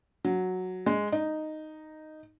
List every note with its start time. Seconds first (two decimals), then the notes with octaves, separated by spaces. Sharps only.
0.25 F#3
0.86 G#3
1.12 D#4